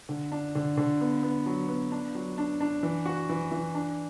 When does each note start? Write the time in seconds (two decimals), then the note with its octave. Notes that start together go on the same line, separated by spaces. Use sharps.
0.09 D3
0.32 D4
0.55 D3
0.77 D3
1.01 B3
1.23 B3
1.46 F#3
1.68 B3
1.92 D4
2.15 F#3
2.38 D4
2.60 D4
2.83 E3
3.06 F#4
3.29 E3
3.52 E3
3.75 D4